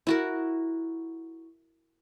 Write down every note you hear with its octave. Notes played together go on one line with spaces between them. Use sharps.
E4 F#4 A#4